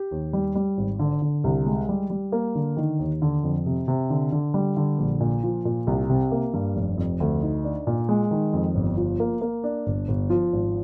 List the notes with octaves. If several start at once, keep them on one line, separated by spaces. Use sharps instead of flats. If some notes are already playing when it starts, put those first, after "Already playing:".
Already playing: G4
D#2
G3
G3
G#1
D3
D3
C2
G#3
G3
G3
A#3
D3
D#3
D#2
D3
F2
C3
C3
D3
D3
G3
D3
A#1
A#2
F3
A#2
C2
C3
A#3
G2
F1
F2
D2
D#4
D4
A#2
G#3
D#3
F2
G1
F3
A#3
A#3
D4
G1
G1
F3
G#1